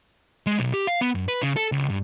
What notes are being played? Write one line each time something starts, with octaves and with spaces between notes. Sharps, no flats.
G#3
B1
G4
F5
B3
F#2
B4
C#3
A4
C#2
G2